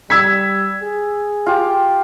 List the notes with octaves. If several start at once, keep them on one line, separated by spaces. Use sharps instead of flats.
G3 E6 G#6 B6
G#4
F4 G4